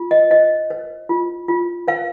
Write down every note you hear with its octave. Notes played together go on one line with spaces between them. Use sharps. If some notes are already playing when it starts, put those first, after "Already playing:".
Already playing: F4
D#5
C5 D#5
C5
F4
F4
C5 F5